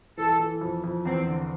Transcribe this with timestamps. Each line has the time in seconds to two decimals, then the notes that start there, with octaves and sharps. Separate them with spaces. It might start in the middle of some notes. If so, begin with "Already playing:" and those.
0.18 E3 A4
0.40 E3
0.61 F2
0.84 F2
1.05 E2 C4
1.27 D3